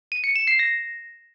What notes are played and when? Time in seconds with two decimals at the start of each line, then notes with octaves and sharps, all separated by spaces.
0.12 D#7
0.24 C#7
0.36 E7
0.47 C7
0.59 A#6